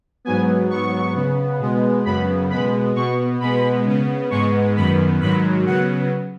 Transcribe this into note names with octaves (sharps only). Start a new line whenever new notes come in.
G#2 F#3 B3 G#5
G#2 F#3 B3 C#6
C#3 B3
B2 G#3 B3
F#2 C#3 B3 B5
B2 G#3 B3 B5
B2 B3 C#6
B2 G#3 B3 B5
C#3 B3
G#2 G#3 B3 C#6
F#2 D#3 B3 B5
G#2 D#3 F#3 B5
C#3 F#3 B3 F#5